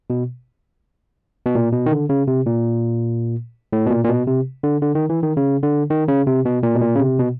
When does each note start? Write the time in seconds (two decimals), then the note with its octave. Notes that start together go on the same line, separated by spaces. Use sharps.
0.10 B2
1.46 B2
1.55 A#2
1.73 B2
1.86 D#3
1.92 D3
2.09 C#3
2.28 C3
2.46 A#2
3.73 A2
3.87 B2
3.91 A#2
4.04 A#2
4.09 B2
4.27 C3
4.63 D3
4.82 D3
4.95 D#3
5.10 E3
5.23 D#3
5.37 C#3
5.63 D3
5.90 D#3
6.08 C#3
6.27 C3
6.45 B2
6.63 A#2
6.75 B2
6.81 A#2
6.95 C#3
7.00 C3
7.19 B2